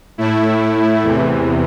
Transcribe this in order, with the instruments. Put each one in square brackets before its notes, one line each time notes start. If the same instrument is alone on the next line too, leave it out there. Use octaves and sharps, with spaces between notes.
[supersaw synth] A2 A3 E4
E2 C3 E3